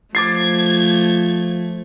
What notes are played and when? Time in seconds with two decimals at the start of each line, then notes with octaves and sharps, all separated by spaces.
0.15 F3 A3 D6 G#6 A6 C7